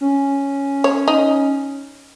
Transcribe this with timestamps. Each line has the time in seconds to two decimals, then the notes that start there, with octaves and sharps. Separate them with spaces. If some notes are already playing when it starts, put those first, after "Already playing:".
0.01 C#4
0.84 C#5
1.08 D#4